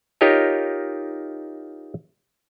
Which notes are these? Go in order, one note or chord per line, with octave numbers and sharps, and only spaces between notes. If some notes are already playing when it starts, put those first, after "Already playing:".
D#4 F4 G4 A#4 C#5 D#5